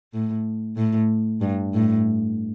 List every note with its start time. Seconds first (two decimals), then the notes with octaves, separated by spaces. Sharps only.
0.13 A2
0.77 A2
1.41 G2
1.74 A2